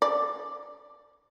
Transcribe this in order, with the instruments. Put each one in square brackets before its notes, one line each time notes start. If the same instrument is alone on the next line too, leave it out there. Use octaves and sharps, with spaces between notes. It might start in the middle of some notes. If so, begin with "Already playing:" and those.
[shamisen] D5